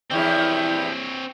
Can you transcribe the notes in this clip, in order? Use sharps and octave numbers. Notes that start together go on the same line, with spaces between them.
E2 F3 G3 C4 E4 C#5 G5